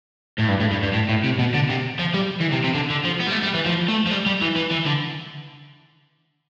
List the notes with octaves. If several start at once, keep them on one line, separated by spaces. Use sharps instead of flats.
A2
G2
A2
G2
G2
A2
A2
C3
B2
D3
C3
F3
G3
E3
C3
C3
D3
D3
F3
B3
G3
A3
G3
E3
F3
A3
F3
G3
G3
E3
E3
E3
D3